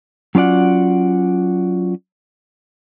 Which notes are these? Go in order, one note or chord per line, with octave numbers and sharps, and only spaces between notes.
F#3 C#4 F4 D5 F#5